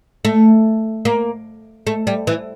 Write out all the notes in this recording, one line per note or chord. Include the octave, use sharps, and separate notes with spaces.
A3
A#3
A3
G3
E3